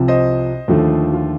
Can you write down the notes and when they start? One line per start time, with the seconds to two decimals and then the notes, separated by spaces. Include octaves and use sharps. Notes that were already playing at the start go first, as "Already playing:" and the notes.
Already playing: C2 C3 F3
0.08 C5 D#5
0.68 D#2 D3 F3 A3
1.13 F4